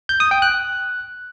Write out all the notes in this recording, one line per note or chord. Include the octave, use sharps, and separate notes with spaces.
G6
D#6
G5
F#6